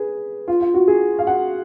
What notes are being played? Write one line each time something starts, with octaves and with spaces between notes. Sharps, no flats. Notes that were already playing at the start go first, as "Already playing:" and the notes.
Already playing: G#4 B4
F4
F4
F#4
G#4
F5
F#5